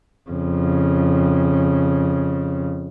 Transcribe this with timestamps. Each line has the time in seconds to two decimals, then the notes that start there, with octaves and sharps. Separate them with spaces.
0.30 F2 C#3